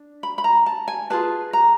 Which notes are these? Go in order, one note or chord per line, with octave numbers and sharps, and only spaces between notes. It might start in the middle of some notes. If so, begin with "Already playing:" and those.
Already playing: D4
B5
B5
A#5
A5
G#5
F4 G#4 B4 A5
A#5